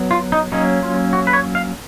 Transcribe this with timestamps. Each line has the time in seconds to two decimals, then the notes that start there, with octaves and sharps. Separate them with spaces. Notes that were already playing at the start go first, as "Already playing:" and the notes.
Already playing: F#3 B3
0.11 F4
0.32 D#4
0.52 F#3 A#3 C#4 D#4
0.83 F4
1.13 F#4
1.27 B4
1.33 C#5
1.55 F5